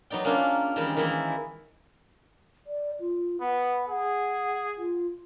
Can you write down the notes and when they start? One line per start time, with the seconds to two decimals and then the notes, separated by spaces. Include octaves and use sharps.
0.10 F#3 B3 D#4 D5 G5
0.25 A#3 C#4 D4 F4 G4 G#4
0.76 D#3 E3 G3 G#3
0.97 D#3 E3 G#3 A#3 E4
2.67 D5
3.00 F4
3.41 B3 F#5
3.89 G#4 F#5
4.78 F4